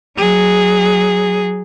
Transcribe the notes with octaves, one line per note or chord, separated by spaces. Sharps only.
F#3 G#4